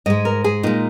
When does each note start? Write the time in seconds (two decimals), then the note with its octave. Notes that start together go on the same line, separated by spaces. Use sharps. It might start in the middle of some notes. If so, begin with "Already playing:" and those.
0.06 G#2 G#3 D#5
0.25 A#4
0.44 G#4
0.63 A#2 G#3 D#4